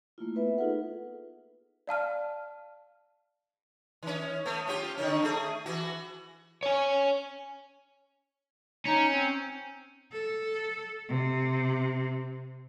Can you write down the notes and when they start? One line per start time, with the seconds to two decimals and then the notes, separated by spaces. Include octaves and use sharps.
0.18 A3 A#3 E4 F4
0.35 B3 B4 E5
0.58 D#4 F4 G#4 A4 B4 F#5
1.87 D5 F5 A5 F6
4.03 D#3 C#4
4.45 A3 B3
4.67 C#4 F4 G4
4.97 D3 D#3 C#4
5.23 A3 G#4
5.66 E3 F#4
6.63 C#5 G#5
8.85 C#4 D#4
9.11 C4
10.12 A4
11.09 C3